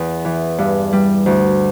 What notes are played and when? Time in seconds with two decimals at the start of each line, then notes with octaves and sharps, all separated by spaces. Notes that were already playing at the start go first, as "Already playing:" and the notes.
Already playing: E2
0.25 E3
0.58 G2
0.93 G3
1.26 D2